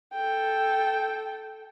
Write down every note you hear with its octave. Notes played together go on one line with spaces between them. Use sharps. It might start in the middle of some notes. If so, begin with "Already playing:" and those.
A4 G5